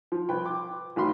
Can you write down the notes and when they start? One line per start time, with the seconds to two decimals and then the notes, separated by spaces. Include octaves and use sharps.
0.12 F3
0.29 C2 B4 G5
0.46 D6
0.96 A1 D#3 F#3 G4 B5 C6